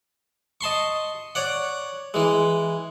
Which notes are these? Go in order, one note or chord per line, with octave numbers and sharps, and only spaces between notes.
D#5 A5 C6 C#6
C#5 D5 F#5
E3 G#3